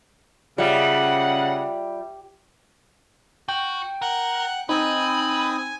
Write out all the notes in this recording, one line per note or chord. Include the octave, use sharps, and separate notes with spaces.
C#3 G3 F4 E5 F#5
F#4 G5
A#4 F#5 F#6
C4 D#4 B4 G#5 D#6
G#5